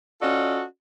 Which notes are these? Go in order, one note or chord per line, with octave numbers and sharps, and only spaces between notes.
C#4 F4 F#4 A4 D5 D#5